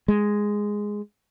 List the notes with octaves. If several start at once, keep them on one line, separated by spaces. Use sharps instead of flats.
G#3